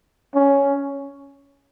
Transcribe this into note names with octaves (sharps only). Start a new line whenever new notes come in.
C#4